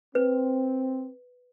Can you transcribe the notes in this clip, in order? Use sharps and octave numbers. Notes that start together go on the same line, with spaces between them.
C4 B4